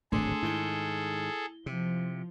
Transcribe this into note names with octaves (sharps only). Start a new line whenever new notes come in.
D1 G#1 D3 A3 D4 G#4 A4 C6
G#2 D#3 E4 G7
C3 F3